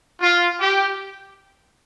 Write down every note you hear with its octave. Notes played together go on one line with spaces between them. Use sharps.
F4
G4